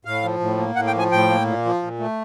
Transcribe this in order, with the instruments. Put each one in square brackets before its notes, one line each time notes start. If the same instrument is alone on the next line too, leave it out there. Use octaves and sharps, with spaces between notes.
[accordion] A2 F5
F3
A2
A#3
A2 F#5
G5
F3 G#5
A2 G5
A#3
A#2
F3
A#2
A3